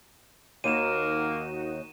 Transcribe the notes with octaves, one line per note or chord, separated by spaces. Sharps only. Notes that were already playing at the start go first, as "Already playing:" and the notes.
D#2 D#3 A#3 D#4 F#4 D#7 E7